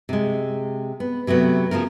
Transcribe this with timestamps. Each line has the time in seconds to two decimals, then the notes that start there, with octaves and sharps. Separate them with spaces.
0.09 C3 G#3
1.00 B3
1.27 C3 F#3 A3 B3
1.71 C#3 F3 A3 A#4